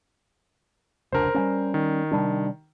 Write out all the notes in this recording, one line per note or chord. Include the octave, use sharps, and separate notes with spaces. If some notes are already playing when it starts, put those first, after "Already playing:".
F1 C#2 D4 A#4 C5
G3 A#3 C#4
D#3
C3 G3 D4